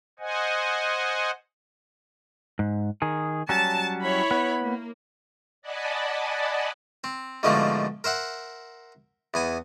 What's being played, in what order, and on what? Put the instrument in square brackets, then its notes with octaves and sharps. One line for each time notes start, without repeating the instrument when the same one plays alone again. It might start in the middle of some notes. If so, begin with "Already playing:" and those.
[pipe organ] C5 D#5 F#5 G#5
[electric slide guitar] G#2
D#3 G#4
[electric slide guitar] F#3 G3 C#4 [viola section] A5
[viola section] E4 C#5 B5
[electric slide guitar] B3
[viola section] A#3
[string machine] D5 D#5 F#5 G#5 A5 B5
[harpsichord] C4
G#2 B2 D3 F3 A3 A#3
A#4 C5 E5 F#5
E2 B3 G#5